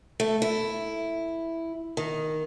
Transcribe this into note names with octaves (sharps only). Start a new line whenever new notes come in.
A3
E4
D#3